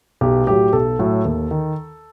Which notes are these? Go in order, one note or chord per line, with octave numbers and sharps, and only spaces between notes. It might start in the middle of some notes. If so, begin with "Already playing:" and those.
B1 G4
A2 F#3 G4
B1 A4
A2 F#3
D#2
D#3